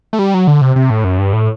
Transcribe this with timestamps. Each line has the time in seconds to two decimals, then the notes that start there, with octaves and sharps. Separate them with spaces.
0.13 A3
0.19 G3
0.34 F#3
0.47 D3
0.61 C3
0.76 C3
0.90 A2
1.04 F#2
1.19 G2
1.33 A2